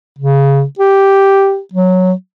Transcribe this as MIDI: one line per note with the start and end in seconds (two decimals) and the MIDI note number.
0.19 0.63 49
0.79 1.59 67
1.73 2.12 54